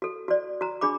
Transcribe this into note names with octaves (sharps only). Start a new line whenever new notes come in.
F#4 A4
F#4 D5
F#4 A#5
D4 G#4 B5 D6